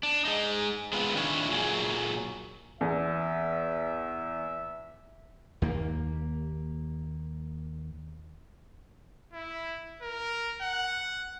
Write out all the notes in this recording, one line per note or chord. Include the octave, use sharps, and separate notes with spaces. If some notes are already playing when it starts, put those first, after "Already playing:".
D4
G#3 D#4
G#3 B3 C4 F4 B4
D#3 D4 E4 F4 C#5
A#2 F#3 G#4
E2 E5
D#2 A#3
E4
A#4
F#5